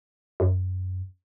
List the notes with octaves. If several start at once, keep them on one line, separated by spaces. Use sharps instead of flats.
F#2